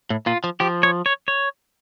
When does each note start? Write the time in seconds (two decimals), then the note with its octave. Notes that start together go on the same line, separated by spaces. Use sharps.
0.10 A2
0.26 A#2 F4
0.44 F3
0.60 F3 G4
0.83 C#5
1.06 C#5
1.28 C#5